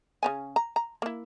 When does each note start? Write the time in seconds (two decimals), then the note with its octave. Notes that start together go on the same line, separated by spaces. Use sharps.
0.23 C#3 C#4 G#5
0.56 A#5
0.76 A#5
1.02 A#3 E4